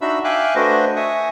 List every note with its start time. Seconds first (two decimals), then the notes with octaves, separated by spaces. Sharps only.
0.01 D4 D#4 F#4 E5 B5 E6
0.24 E5 F5 G5 G#5 D6 F#6
0.55 A3 D4 F#4 B4 C5 D#5
0.96 E5 G#5 C#6 D#6